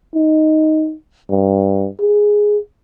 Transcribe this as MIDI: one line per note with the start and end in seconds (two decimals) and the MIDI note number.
0.15 0.94 63
1.30 1.89 43
1.99 2.58 68